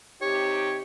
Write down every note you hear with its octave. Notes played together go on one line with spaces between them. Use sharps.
C3 D#4 G4 C#5